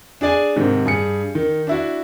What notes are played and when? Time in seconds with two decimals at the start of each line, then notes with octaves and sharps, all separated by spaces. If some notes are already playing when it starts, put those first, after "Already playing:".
0.21 D4 G#4 D5 G#5
0.56 G#2 C3 D#3
0.86 G2 G#4 C#7
1.35 D#3
1.67 D4 E4 F#4